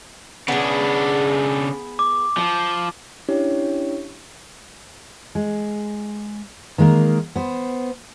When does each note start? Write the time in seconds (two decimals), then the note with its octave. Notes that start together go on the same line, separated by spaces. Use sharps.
0.48 C#3 B3 D4 G#4
1.99 D6
2.37 F3
3.29 C#4 D4 E4 G4 C#5
5.35 G#3
6.78 D#3 G#3 A#3 A#4
7.36 B3 C5